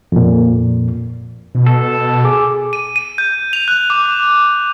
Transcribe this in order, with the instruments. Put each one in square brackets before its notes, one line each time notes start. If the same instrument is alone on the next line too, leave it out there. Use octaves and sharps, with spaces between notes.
[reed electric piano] F2 A#2
[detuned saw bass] B2
[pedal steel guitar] A4
[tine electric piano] G#4 G#5 D6
[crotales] D#7
D#7
G6
F7
F#6
D6